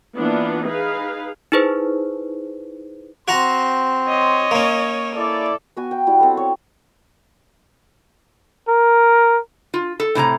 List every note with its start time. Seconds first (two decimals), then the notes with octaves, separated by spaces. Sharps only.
0.16 E3 A#3 B3 D4 F4
0.64 D#4 G#4 B4 F5
1.52 D#4 E4 G#4 B4 C5
3.28 C4 F#4 F#5 A#5 C6
4.08 C#5 D#5
4.51 A#3 C#4
5.16 E4 A4 D5
5.77 B3 F#4 G#5
5.91 G5
6.07 G3 E4 F#4
6.20 C4 A4
6.37 C#5
8.69 A#4
9.74 F4
10.00 A4
10.15 A2 C3 A5 A#5